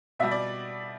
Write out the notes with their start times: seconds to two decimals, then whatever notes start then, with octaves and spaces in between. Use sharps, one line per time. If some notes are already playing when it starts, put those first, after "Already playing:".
0.19 B2 G3 E5
0.31 D5